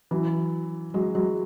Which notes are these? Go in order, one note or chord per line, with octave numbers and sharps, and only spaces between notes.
E3 F#3
F#3 G#3
F#3 G#3